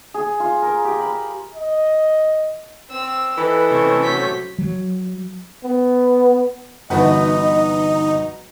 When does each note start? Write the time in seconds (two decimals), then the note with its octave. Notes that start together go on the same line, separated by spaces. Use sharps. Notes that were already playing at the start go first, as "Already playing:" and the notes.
0.14 G#4
0.40 F4
0.62 A#4
0.85 G4
1.00 B5
1.55 D#5
2.90 C4 E6
3.38 E3 A4 B4 D#5
3.71 C3 A3 C#4
4.03 F#3 G6 B6
4.58 F#3
5.64 B3
6.90 G1 E3 D#4 F#4 B4 D#5 F#5 A5